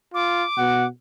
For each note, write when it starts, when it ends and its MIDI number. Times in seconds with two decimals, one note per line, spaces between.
0.14 0.44 65
0.14 0.87 86
0.58 0.87 47
0.58 0.87 78